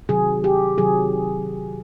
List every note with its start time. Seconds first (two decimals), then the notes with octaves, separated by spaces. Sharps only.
0.09 C3 D#3 F#3 G#4
0.44 G4
0.78 C3 D#3 F#3 G#4